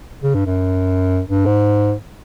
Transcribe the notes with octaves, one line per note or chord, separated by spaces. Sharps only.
C#3
G2
F#2
G2
G#2